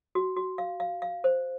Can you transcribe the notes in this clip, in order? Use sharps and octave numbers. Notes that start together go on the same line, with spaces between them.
F#4
F#4
F5
F5
F5
C5